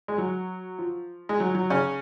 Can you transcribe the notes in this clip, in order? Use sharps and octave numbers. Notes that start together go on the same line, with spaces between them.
G#3
F#3
F3
G#3
F#3
F#3
C#3 C#4